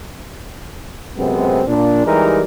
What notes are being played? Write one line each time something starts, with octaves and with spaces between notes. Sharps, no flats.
F#2 C3 G#3 B3 C4
A#2 D4
E3 G3 G#3 D#4 G4 A#4